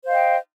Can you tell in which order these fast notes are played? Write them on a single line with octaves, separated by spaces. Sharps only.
C5 F5 D#5 G5